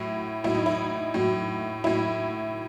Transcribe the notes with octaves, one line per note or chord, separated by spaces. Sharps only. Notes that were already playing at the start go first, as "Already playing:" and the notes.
Already playing: A2 F#3 E4
A2 F#3 E4
D#4
E4
A2 F#3
A2 F#3 E4